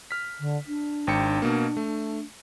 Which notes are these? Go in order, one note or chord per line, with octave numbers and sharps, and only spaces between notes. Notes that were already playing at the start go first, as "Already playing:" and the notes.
F6 B6
D3
D4
G#1 G5 C#7
B2 A#3
A3